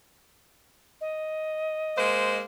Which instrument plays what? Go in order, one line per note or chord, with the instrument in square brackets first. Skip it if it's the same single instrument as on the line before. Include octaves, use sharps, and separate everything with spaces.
[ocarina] D#5
[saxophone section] G#3 A#3 C5